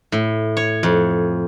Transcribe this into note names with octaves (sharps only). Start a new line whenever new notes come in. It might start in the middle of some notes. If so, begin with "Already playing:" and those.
A2
C#5
F2